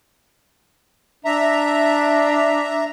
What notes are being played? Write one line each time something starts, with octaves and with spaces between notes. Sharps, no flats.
D4 E5 A#5